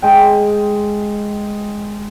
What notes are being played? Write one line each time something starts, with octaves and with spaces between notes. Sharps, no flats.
G#3 G5